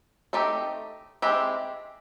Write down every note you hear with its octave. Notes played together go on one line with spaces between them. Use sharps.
A3 C4 D#4 G4
G#3 C4 E4 G4